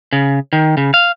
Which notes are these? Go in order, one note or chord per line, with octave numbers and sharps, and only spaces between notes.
C#3
D#3
C#3
F5